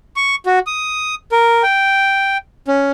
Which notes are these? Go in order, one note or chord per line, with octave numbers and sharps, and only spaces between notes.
C#6
F#4
D#6
A#4
G5
C#4